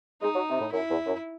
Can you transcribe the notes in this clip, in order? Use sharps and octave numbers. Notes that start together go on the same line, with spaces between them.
G#3 D#4
F#3
C3
A2
F#2 E4
E2
F#2